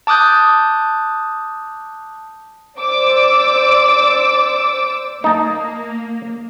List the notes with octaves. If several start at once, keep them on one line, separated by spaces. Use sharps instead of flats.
A5 D6 D#6 F#6 G6
C5 D5 D6 E6
A#3 D#4 A5 A#5